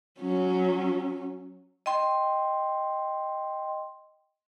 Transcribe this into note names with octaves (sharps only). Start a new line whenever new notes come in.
F#3 C#4
D#5 G5 C6